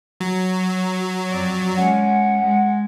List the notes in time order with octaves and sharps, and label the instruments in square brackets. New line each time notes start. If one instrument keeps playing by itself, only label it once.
[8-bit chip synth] F#3
[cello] F2 D5
[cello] G#3 C#4 [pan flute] F#5
[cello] G#3